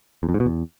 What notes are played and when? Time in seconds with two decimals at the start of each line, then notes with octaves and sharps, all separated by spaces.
0.23 E2
0.29 F2
0.34 G#2
0.40 B2
0.46 E2